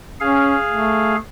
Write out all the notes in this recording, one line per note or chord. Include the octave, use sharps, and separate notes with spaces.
C#4 G#4 F5
A3